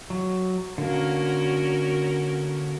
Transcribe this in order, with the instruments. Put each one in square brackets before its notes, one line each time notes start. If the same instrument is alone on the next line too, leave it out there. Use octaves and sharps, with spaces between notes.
[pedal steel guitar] F#3
[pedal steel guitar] D3 A#3 [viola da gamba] C#4 F#4 A#4